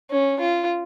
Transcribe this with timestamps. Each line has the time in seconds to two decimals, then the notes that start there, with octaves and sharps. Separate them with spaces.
0.11 C#4
0.40 F4